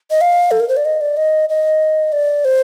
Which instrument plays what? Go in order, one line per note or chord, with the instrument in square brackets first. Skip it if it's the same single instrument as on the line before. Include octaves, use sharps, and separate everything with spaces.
[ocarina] D#5
F5
A4
A#4
C5
D5
D#5
D5
D#5
D#5
D5
C5